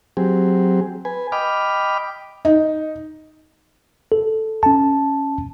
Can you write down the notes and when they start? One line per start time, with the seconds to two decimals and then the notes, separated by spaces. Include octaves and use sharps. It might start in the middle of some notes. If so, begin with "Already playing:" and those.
0.17 F#3 C4 G4 G#4
1.05 B4 G#5
1.32 D#5 G5 B5 D6 F6
2.45 D#4
4.12 A4
4.63 C#4 A5